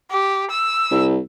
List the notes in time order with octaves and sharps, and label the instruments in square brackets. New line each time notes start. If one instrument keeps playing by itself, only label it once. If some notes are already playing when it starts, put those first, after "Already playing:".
[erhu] G4
E6
[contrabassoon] C2